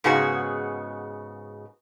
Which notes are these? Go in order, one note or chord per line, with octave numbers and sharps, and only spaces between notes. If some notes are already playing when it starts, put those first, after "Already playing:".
G#2 C#3 B3 F#4 G#4